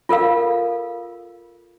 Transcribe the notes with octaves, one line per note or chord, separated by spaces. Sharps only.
F4 A4 A#4 F5